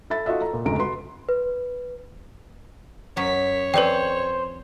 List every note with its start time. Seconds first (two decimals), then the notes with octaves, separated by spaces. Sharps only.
0.10 A4 E5 B5 A6
0.26 D#4 F4 F#4 A4 D#5 E5
0.41 A4 A#5
0.53 A#2
0.65 F1 D2 G#2 C#3 A#5 D7
0.79 F#4 B4 C6
1.29 B4
3.17 F#2 F#3 C#5 B6
3.74 F2 B4 C5 D5 G5 G#5